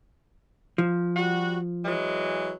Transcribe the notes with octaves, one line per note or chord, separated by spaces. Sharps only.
F3
G3 F#4
E3 F#3 G#3